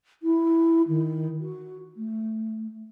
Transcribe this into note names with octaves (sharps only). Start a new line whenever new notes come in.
E4
D#3
F#4
A3